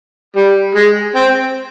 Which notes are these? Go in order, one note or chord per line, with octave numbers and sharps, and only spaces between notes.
G3
G#3
C4